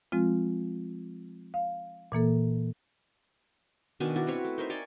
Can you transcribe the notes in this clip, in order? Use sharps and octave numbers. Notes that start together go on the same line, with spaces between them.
F3 G#3 C4 F4
F5
A#2 E3 A#3 A4
B2 D#3 D4 G#5
E4 F#4 D5
C4 E4 B4 C#5
A3
D#4 A#4 C5 E5
C#5 D5 G5 G#5